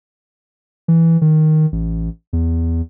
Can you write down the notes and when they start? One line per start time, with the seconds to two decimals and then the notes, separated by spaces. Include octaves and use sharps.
0.88 E3
1.21 D#3
1.72 A1
2.33 E2